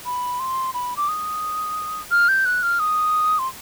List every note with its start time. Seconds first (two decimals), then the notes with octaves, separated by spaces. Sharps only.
0.05 B5
0.40 C6
0.74 B5
0.97 D6
1.09 D#6
2.11 F6
2.28 G6
2.45 F#6
2.63 F6
2.80 D#6
3.39 C6